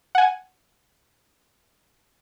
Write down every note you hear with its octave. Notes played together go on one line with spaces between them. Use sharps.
F#5 G#5